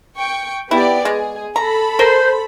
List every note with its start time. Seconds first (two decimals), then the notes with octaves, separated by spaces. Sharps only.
0.18 G5 C#6
0.71 B3 E4 G4 D5
1.05 G#3 G#4
1.56 A4 A#5 B5
1.99 A#4 C5